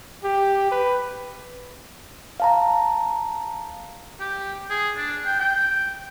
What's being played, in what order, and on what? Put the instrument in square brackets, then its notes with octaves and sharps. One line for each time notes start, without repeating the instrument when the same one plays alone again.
[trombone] G4
B4
[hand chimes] F5 A5 A#5
[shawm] G4
G#4
D4
G5
G5